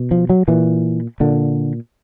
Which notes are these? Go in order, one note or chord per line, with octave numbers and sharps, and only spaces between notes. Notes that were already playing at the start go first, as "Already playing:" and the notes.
Already playing: B2
F3
F#3
A#2 E3
A#2 D3